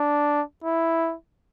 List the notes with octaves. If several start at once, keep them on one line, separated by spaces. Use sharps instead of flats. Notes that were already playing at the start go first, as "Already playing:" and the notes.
Already playing: D4
E4